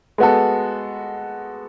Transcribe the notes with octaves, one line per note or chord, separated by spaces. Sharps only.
G#3 B3 F#4 A4